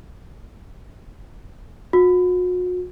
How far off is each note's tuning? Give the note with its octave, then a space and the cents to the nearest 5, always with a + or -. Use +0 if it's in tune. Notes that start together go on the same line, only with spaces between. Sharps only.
F#4 -40